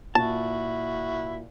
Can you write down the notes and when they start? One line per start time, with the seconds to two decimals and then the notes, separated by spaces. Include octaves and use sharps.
0.15 A#2 E4 F#4 A5